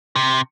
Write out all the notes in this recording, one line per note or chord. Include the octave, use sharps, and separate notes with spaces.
C3